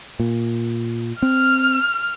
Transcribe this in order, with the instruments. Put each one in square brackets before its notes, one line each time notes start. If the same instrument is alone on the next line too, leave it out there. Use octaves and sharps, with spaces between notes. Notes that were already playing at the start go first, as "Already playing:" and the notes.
[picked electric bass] A#2
[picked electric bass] C4 [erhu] F6